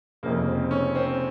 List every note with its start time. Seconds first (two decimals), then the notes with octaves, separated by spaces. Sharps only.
0.23 F1 F2 C#3 A#3
0.48 C4
0.71 C#4
0.95 C4